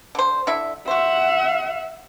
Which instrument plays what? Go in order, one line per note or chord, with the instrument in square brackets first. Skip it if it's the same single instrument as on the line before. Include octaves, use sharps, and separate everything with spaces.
[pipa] D3 C5
D3 E4 E5
[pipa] F#4 C5 [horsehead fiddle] E5 F#5